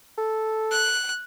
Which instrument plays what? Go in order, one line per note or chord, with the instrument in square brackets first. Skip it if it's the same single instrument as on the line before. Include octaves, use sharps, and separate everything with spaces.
[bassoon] A4
[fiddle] F#6